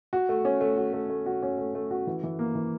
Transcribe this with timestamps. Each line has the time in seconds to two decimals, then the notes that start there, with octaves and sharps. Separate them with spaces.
0.13 F#4
0.29 A3
0.45 C#4
0.61 A3
0.77 F#4
0.93 A3
1.09 A3
1.26 F#4
1.43 C#4
1.58 A3
1.75 A3
1.91 F#4
2.07 E3
2.23 E3
2.39 A#3
2.55 E3